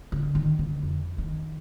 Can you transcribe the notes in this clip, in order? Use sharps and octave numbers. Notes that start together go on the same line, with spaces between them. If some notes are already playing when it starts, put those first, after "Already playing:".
D3
D#3
D3
F2
D#3